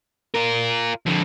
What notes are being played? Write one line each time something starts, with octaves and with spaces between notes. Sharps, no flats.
F4 A#4
F2 D3